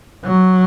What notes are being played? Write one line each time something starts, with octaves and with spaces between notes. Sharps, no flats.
F#3